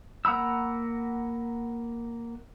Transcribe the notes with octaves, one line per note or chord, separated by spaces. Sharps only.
A#3 F#5 A#5 B5 E6